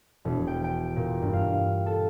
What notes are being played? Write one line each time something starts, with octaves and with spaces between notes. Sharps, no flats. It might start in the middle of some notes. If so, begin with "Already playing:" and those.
E1
G5
G5
A#2
G2
F5
A4